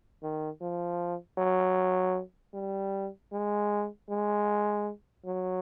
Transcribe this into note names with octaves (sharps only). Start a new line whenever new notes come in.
D#3
F3
F#3
G3
G#3
G#3
F#3